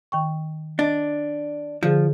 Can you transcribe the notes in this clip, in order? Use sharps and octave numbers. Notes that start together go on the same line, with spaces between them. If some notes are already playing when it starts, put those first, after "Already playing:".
D#3 G5 C#6
D4 D#5
D3 F3 G#4 C5